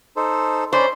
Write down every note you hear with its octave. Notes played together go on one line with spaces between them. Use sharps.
D#4 A4 C5
C#4 C5 D5 B5